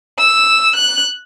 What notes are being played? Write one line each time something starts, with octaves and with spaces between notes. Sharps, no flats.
E6
F#6